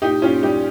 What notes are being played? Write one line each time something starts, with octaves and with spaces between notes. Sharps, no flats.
A#2 D#4 G4
A#2 C#4 F4
G3 D#4 G4